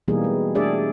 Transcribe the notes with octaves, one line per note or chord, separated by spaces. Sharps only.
B2 E3 G3 A#3 D#4 G#4
G#3
A3 D4 G4 G#4 D5 E5